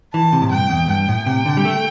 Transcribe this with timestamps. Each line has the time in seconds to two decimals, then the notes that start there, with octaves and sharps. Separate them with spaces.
0.14 E3 A5
0.33 C3
0.42 A2
0.52 G2 G5
0.70 E2
0.88 G2 G5
1.09 A2
1.26 C3
1.46 D3
1.57 G3
1.65 A3